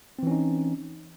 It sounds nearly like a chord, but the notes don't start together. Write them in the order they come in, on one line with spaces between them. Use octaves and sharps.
C4 E3 C#4 D#4